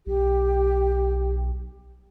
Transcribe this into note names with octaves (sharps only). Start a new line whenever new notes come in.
B1 G4